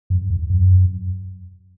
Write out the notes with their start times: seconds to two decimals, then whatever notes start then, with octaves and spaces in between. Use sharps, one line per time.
0.10 F#2
0.30 E2
0.50 F#2